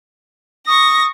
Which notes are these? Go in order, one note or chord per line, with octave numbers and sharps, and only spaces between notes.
C#6 D#6 A#6